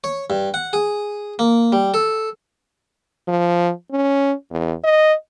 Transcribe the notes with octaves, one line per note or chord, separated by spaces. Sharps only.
C#5
G2
F#5
G#4
A#3
G3
A4
F3
C#4
E2
D#5